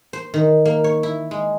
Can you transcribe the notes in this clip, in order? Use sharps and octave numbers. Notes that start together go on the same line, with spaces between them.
C5
D#3
A#3
C#5
E4
G#3